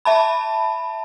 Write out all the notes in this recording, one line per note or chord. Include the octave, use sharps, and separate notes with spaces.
E5 A5 B5